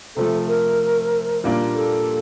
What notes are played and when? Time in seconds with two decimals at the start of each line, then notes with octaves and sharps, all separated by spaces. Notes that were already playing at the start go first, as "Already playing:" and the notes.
0.17 C3 F3 A3 A4
0.48 A#4
1.44 A#2 G3 A#3 D4 F4
1.75 A4